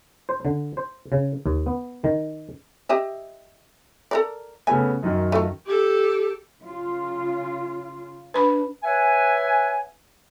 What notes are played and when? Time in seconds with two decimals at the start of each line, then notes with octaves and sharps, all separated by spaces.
0.29 C5
0.45 D3
0.77 C5
1.12 C#3
1.46 D#2
1.66 B3
2.04 D#3
2.89 G4 D#5 E5
4.11 A4 A#4 D5
4.67 C#3 A3 B3 G#5
5.03 F#2 D#3
5.32 A3 F4
5.66 G4 A4
6.61 C#3 F4
8.34 D4 B4 B5
8.84 B4 C#5 E5 F#5 G#5